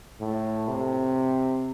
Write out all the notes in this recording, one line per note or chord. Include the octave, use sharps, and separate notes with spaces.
A2
C3